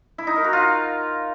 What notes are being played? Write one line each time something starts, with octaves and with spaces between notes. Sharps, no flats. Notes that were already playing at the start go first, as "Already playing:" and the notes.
E4
D#4
A#4
F#4
F4